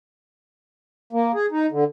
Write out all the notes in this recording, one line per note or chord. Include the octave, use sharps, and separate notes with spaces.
A#3
G#4
D#4
D3